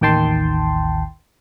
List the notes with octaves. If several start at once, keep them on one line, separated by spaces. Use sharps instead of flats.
A1 D#2 D#3 G5 A5 C6